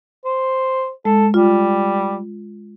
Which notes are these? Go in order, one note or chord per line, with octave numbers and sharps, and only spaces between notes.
C5
G#3 A4
G3 F4